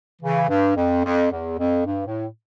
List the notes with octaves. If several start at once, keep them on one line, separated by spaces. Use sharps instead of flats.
C#3 E3
G2
F2
F2
E2
F2
G2
A2